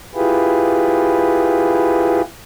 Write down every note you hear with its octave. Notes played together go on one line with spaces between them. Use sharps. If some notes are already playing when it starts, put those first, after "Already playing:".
E4 F4 G4 G#4 B4